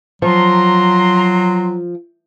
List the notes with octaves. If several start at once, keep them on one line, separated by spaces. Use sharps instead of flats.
F3 F#3 A#5 C6